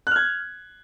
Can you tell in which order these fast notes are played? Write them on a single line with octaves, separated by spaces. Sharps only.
F#6 F6 G#6